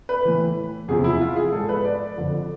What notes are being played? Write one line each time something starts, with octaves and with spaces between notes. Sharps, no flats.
B4
A2 E3
E2 C3 F3 G#4
E4
F4
G#4
G#2 F3 A4
B4
D5
F2 D3 F3